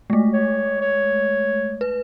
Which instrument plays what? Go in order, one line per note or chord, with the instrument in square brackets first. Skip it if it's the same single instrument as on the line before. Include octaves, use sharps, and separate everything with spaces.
[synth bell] G#3 A3
[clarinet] C#5
C#5
[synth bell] B4